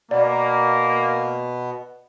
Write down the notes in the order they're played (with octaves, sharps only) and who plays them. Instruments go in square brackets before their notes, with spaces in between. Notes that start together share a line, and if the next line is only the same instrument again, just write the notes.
[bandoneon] B2 B3 [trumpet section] A#3 [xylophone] D5